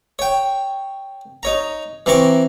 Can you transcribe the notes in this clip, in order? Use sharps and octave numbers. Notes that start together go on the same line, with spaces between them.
C#5 G5
D#4 C#5 A#5
E3 C4 A#5 C#6 D6